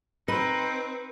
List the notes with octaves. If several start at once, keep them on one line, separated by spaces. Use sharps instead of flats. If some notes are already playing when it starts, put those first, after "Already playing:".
C4 D#4 B4